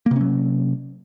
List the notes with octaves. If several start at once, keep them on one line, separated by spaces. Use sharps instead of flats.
C3 F#3 A#3 C#4